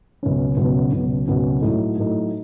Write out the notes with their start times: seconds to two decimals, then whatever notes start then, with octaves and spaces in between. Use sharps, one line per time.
0.23 C#2 B2 F#3 C#4
0.57 C#2 B2 F#3 C#4
0.93 C#2 B2 F#3 C#4
1.28 C#2 B2 F#3 C#4
1.62 A2 F#3 A3 D#4
1.97 A2 F#3 A3 D#4